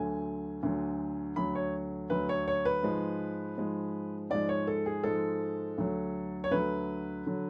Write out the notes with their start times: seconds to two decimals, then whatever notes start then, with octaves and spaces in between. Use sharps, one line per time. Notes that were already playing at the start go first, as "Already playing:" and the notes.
Already playing: D2 D3 F#3 G#5
0.63 D2 D3 F#3
1.36 D2 D3 F#3 B5
1.55 C#5
2.10 D2 D3 F#3 B4
2.29 C#5
2.48 C#5
2.65 B4
2.83 G#2 F3 G#3
3.57 G#2 F3 G#3
4.30 G#2 F3 G#3 D5
4.49 C#5
4.67 A4
4.86 G#4
5.03 G#2 F3 G#3 A4
5.78 D2 D3 F#3
6.44 C#5
6.51 D2 D3 F#3 B4
7.27 D3 F#3